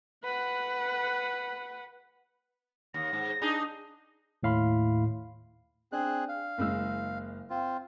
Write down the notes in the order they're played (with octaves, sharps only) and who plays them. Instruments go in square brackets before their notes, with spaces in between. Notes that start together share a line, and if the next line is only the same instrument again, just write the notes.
[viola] B4 F#5
[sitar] D#2 [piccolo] A#6
[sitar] G#2
D4 D#4 G#4
[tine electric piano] D#2 A2 F5 B5 C6
[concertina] C4 G#4 F#6 [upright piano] D4
[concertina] F5
[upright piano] F#1 G#3 E6
[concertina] C4 F4